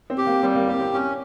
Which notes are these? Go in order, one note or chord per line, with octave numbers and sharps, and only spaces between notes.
C4
G4
A#3
G3 C4
A#3
C4 G4
C4
C#4